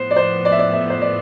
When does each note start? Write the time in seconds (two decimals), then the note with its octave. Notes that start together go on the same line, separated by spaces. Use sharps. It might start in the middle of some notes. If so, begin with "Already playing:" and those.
Already playing: A2 F3 B3 C5
0.11 D5
0.16 C5
0.45 D5
0.52 E5
0.59 D5
0.73 E5
0.90 C5
1.02 D5